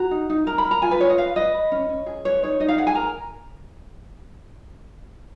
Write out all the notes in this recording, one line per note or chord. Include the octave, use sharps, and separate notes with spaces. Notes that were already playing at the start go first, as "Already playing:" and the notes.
Already playing: F#4 A#5
D#4
D#4
A#4 A#5
B5
A#4
A#5
F4 G#5
B4
F4 C#5
D#5
B4 F5
B4 D#5
B4
C#4
C#4
G#4
B4 C#5
D#4 C#5
D#4 D#5
F5
G#4 F#5
G#5
A#4 A#5